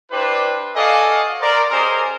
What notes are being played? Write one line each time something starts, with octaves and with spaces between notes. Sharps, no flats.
D4 E4 G4 B4 C5 D5
F#4 A4 D5 D#5 F5 G#5
A#4 C5 D5
C#4 G4 G#4 A#4 C5 D#5